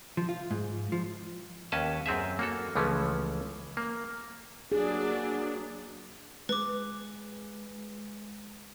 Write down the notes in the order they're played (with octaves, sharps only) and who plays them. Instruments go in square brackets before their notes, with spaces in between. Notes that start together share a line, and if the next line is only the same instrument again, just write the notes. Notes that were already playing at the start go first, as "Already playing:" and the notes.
[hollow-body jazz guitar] F3
F4
G#2
F3
[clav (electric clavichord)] D#2 C#4 B4 D#5 A5
F#2 C4 G#4 E5
A#3 F#4 A4
C#2 E3 F3 A3 C#4
A#3
[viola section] F#3 A#3 D4 [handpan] G#4
[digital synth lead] G#3 [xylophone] B4 D6